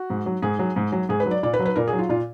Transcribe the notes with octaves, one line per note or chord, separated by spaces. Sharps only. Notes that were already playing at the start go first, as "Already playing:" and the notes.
Already playing: F#4
G#2
F#3
G#2 G#4
F#3
G#2
F#3
G#2 G#4
B4
F#3
D5
A#2 D5
B4
F#3
B4
A#2 A#4
G#4
F#3
F4
A#2 F4